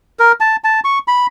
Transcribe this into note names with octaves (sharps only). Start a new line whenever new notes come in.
A#4
A5
A5
C#6
B5